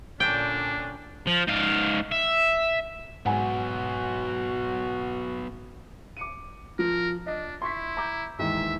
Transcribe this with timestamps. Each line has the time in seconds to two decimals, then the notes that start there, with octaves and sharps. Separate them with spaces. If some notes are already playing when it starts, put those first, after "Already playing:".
0.20 A#2 D3 C#4 D4 G5
1.27 F3
1.47 G#2 F5
2.11 E5
3.26 G#2 F#3 B3 F#4 F#5 G#5
6.17 D6 C#7 D#7
6.79 F3 A#4
7.26 D4 D#5
7.62 E4 C6 C#6 B6
7.97 A#5 D6 G6
8.39 D#2 G#2 E3 E5